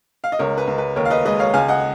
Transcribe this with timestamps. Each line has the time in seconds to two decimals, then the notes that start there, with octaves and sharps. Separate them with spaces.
0.24 F5
0.32 D#5
0.39 C#2 A#4 C#5
0.58 B4
0.67 C#2
0.78 B4
0.96 D#2 A#4 C#5
1.05 F5
1.10 B4 D#5
1.25 G#3 B4 D#5
1.39 C#5 F5
1.54 C#2 F5 G#5
1.68 D#5 F#5